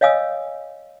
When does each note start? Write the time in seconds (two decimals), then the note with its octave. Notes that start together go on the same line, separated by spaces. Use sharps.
0.01 C#5 D#5 F5 G#5 D#6 E6